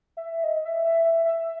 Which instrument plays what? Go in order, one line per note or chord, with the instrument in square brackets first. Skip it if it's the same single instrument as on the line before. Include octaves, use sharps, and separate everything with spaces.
[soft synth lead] E5
D#5
E5
E5
E5
E5